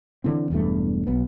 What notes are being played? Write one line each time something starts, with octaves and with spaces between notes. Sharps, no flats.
D3 E3 C4
E1 E2 G2 A3
B1 B3